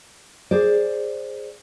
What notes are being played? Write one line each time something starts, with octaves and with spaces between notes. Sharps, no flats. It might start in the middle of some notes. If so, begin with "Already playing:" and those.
G#4 C5 D5